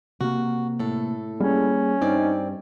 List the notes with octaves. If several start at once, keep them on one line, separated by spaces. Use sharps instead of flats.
C3 A#3 F#4
A2 A4
G3 A#3 C#4 G#4
G2 C4 D#4 D5